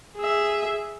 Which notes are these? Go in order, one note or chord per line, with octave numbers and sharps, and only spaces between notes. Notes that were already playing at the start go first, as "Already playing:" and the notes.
G#4 E5